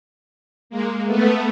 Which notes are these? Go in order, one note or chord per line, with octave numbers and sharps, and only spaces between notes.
G#3 A#3
A3 B3